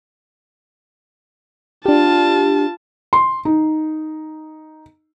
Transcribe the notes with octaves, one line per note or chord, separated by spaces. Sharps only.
D4 F4 G4 A5
C6
D#4